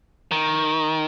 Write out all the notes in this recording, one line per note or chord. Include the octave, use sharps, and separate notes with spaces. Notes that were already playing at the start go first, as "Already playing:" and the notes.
D#3